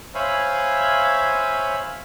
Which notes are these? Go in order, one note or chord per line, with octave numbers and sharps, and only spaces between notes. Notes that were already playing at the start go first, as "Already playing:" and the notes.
C5 C#5 E5 F5 G#5 B5